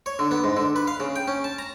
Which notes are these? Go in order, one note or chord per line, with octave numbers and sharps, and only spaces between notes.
C#5
D3
B3
G#2
D3
B4
F5
C#3
G5
C#4
A5
A#5